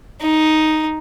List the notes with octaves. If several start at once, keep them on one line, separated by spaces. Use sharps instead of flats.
D#4